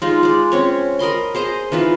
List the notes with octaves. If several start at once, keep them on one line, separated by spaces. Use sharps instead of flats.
G#3 D#4 F4
G#3 D5
C4 C#4 C#5
A#4 D#5 B5 C6
G#4 C5 D#5 A#5
E3 D#4 F4 B4